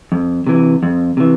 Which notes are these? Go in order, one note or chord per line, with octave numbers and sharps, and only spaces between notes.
F2
C3 E3
F2
C3 E3